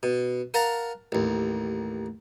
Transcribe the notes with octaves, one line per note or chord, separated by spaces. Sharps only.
B2
A#4 F5 F#5 A5 A#5
A1 D#2